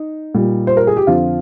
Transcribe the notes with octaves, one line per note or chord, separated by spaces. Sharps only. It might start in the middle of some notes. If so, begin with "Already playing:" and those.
Already playing: D#4
A#2 G3
C5
A#4
G#4
G4
F2 D3 F3 F4